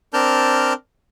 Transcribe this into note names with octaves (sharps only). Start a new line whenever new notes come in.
C4 D4 A#4 A5 F6 G6